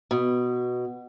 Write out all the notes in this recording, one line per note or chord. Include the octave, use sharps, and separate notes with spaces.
B2